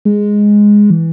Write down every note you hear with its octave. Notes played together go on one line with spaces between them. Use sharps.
G#3
E3